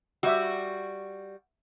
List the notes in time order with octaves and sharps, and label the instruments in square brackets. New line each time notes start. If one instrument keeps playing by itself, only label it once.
[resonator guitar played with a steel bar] G3 F#4 [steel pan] E5 E6